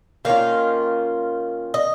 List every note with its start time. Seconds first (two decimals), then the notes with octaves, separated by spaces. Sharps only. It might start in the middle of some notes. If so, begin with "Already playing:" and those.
0.25 D#3 A#3 C#4 F4 F5
1.74 D#5